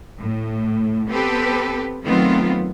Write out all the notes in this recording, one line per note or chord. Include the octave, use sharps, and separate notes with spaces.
A2
B3 C4 G4 A4 B4
D#3 F#3 A3 B3 C4 F4